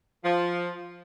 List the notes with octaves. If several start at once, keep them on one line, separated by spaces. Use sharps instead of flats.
F3